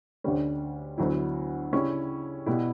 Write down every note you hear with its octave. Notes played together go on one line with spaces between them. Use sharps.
D2 D3 G3 C#4
D2 D3 F#3 B3 E4
C#3 G3 C#4 E4
B2 G3 B3 E4